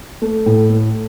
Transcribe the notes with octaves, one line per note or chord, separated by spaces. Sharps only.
A3
A2
A3